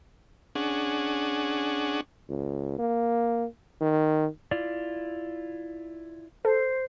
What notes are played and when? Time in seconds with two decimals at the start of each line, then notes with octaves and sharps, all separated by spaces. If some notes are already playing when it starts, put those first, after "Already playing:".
0.55 C#4 D4 G#4 F#5
2.29 C#2
2.79 A#3
3.81 D#3
4.51 E4 F4 D5
6.45 A4 C5